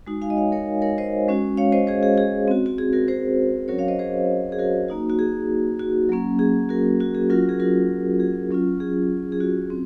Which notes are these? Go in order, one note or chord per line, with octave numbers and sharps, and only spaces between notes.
G#3 D#4 F#4
F5 G#5
D#5
C#5 F5
A#4 C#5
A#4 C#5
C5 D#5
G#3 C#4 F#4
C#5 F5
C5 D#5
G#4 C5
G#4
G#4
C4 F#4
F#4
G#4
F#4 A#4
G#4 C5
F#3 C#4 F#4 A#4 C#5
C#5 F5
C5 D#5
G#4 C5
G#4
F#4 A#4
A#3 D#4 F#4
F#4
G#4
F#4
F#3 A#3 C#4
G#4
F#4 A#4
F#4
G#4
F#3 C#4 F4 F#4 A#4
G#4
F#4 A#4
G#4
F#3 C#4 F4
G#4
G#4
F#4
C4